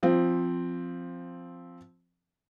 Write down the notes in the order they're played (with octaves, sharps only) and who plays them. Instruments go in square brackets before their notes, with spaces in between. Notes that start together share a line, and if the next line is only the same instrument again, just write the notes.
[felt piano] F3 C4